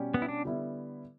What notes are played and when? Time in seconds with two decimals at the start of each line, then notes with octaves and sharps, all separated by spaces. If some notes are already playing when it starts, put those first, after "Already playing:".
Already playing: B2 G3 C#4 G4
0.14 B3
0.22 E4
0.29 D4
0.45 D3 G3 B3 E4